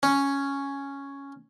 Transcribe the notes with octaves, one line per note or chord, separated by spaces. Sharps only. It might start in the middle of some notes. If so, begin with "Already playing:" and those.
C#4